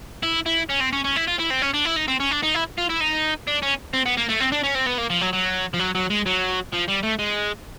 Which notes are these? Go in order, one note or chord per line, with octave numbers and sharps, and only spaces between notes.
E4
E4
C#4
C4
C#4
C#4
E4
F4
E4
C4
C#4
D4
E4
D#4
C4
C#4
D4
D#4
E4
F4
E4
D#4
D4
C#4
C4
B3
A#3
A3
C4
D4
C#4
C4
B3
A#3
F3
F#3
F#3
F3
F#3
F#3
G#3
F#3
F3
G3
A3
G#3